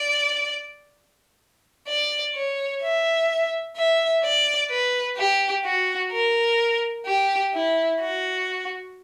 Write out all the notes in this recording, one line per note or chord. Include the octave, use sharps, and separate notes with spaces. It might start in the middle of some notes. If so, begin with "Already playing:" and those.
Already playing: D5
D5
C#5
E5
E5
D5
B4
G4
F#4
A#4
G4
E4
F#4